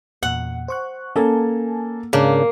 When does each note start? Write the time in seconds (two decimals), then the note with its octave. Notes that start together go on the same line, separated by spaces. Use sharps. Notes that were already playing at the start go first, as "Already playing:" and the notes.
0.23 E2 A#2 F#5
0.68 C5 C#6 F#6
1.16 A#3 C#4 A4 G#5 A5
2.13 G#2 C#3 A#3 D4